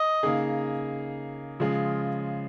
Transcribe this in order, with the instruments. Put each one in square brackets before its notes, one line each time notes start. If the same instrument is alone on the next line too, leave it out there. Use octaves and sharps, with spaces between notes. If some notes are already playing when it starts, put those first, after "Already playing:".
Already playing: [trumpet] D#5
[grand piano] C#3 A#3 D#4 G#4
C#3 F3 G#3 F4 G#4